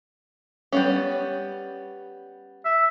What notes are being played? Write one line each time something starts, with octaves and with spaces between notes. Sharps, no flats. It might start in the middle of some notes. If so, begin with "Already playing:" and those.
G3 B3 C#4
E5